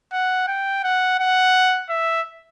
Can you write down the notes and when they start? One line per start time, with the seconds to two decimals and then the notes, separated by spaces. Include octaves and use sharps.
0.13 F#5
0.48 G5
0.84 F#5
1.20 F#5
1.90 E5